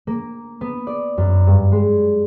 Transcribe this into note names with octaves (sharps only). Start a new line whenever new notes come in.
A#3
B3
D5
F#2
G2
G#3